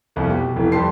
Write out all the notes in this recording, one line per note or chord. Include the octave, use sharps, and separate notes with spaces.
F1 C2 F2
B2 G4
F1 E3
F2 G3 G4 A5 C6 C7